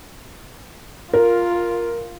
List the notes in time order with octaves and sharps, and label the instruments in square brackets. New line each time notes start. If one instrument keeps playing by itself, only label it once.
[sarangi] F4 [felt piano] A#4